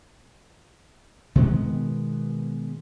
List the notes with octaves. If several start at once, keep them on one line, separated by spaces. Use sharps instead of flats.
B2 D#3 G#3 B3